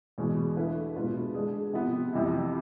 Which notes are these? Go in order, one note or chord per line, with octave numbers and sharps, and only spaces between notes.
E2 B2 G#3
D3 A3 E4 B4
B2 G#3 D4 F4 B4
D3 G#3 D4 G#4
C3 F3 B3
F2 C3 E3